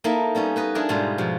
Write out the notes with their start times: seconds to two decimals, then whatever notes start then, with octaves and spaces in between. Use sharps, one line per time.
0.04 A#3 D#4 E4 A4 E5
0.35 G3 B3 C#4 D#4
0.56 B3 B4 D#5
0.75 D4 E4 G#4 A#4 D5 G5
0.89 G#2 B2 G3 G#3 D#4 F4
1.18 B2 F3